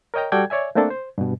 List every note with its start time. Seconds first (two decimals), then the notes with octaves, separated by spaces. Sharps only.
0.14 A#4 C#5 D#5 G5 A#5
0.32 G3 F#4 A4 D5 G5 G#6
0.50 C#5 D5 E5 G#5
0.75 A3 A#3 C4 D4 A4
0.90 C5
1.18 G2 B2